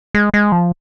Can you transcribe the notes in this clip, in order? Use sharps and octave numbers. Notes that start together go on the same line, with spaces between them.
G#3
G#3
F3